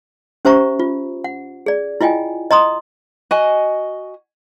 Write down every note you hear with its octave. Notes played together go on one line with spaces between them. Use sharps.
C#4 G4 C5 E5 A#5 C#6
F4
F#5
G#4 D5
E4 F4 D#5 G5 G#5
D#5 A#5 C6 D#6
F#4 D#5 G#5